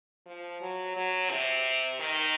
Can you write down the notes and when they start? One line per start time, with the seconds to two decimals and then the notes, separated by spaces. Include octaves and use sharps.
0.26 F3
0.61 F#3
0.96 F#3
1.30 C3
2.00 D#3